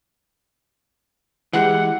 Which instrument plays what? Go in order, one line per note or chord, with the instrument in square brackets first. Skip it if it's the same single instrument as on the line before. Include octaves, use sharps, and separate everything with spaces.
[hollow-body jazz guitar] E3 G#3 G4 [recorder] F#5